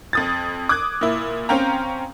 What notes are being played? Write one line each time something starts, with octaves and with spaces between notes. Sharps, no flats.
F2 D#6 A6
D6 D#6 F#6 G#6
A#2 E4
C4 C#4 F5 G5 A#5